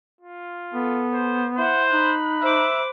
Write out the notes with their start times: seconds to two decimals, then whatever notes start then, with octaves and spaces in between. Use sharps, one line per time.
0.21 F4
0.74 B3 A4
1.13 C5
1.58 E4 C5 F#5
1.92 D#4 B5 F#6
2.42 C5 E5 D6